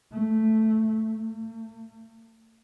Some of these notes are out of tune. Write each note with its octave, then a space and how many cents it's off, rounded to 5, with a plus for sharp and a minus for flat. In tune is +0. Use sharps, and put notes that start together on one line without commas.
A3 +0
A3 +40